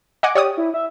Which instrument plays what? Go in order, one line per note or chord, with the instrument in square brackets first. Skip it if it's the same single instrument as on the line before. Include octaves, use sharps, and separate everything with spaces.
[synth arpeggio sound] D#5 F#5 G#5 [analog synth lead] D6
[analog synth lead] G4 [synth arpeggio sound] C#5 D5 D#6
[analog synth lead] E4
E5